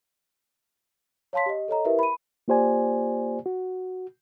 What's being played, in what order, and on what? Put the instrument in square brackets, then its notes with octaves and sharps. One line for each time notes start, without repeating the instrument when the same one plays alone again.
[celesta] C#5 F5 A5 C6 B6
G4 D#5
A4 C#5 D#5 A#5
E4 G4 A#4 B4 E5
B5 D#7
[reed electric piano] A#3 F4 G4 C5 D5 G#5
F#4